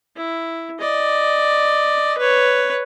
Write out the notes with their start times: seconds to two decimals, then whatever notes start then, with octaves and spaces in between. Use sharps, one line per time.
0.16 E4
0.80 D5 D#5
2.18 B4 C#5